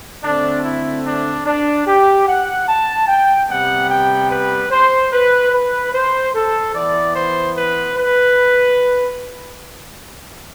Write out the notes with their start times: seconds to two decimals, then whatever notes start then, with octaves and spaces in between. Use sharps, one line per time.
0.23 D3 A3 C4 D4
0.64 E4
1.05 D4
1.45 D4
1.87 G4
2.27 F#5
2.68 A5
3.08 G5
3.49 C3 G3 B3 F#5
3.90 G5
4.30 B4
4.71 C5
5.13 B4
5.52 B4
5.93 C5
6.35 A4
6.74 E3 B3 D5
7.15 C5
7.57 B4
7.97 B4